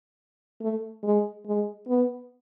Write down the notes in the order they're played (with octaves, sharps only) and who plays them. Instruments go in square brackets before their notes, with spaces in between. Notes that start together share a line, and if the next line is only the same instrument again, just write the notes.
[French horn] A3
G#3
G#3
B3